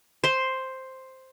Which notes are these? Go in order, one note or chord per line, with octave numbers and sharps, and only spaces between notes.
C5 C6